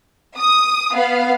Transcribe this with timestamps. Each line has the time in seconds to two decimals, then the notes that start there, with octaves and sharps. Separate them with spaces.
0.38 D#6
0.94 B3 F5